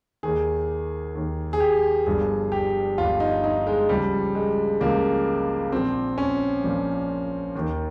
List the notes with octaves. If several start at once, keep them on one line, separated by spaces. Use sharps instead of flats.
D#2 D#3 G#4
D#2 D#3
G#4
G4
G1 G2 F3 G#4
G4
G1 G2 F3 F4
D#4
D#4
G#3
C#2 C#3 F3 G3
G#3
C#2 C#3 F3 A#3
A#1 A#2 F3 C4
C#4
A#1 A#2 F3
D#2 D#3